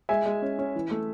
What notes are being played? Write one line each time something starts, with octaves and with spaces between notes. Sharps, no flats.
G#3 E5 G#5
G#3
C#4
C#4
E3
A3